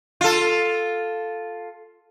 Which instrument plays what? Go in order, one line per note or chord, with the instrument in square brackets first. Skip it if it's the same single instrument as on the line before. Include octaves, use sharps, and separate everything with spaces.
[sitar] F4 A4